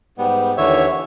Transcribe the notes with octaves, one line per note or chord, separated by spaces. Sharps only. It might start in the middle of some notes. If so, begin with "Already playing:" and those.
G#2 G3 B3
D#2 D3 E3 C#5 E5